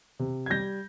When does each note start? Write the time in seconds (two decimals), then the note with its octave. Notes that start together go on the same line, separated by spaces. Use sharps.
0.19 C3
0.46 G#6
0.50 G3 G6 A#6